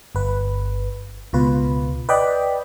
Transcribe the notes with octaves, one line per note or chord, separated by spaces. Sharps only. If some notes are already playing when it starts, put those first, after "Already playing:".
G1 B4
C#2 B2 F4 B4
B4 D5 D#5 G5 B5